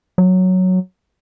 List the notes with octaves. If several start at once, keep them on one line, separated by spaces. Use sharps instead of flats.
F#3